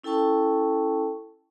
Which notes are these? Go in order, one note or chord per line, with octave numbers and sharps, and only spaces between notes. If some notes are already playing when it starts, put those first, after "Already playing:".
C#4 E4 A4 G5 A5 C#6